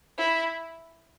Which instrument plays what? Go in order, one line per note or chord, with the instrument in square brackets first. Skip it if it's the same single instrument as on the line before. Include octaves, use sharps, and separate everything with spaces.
[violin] E4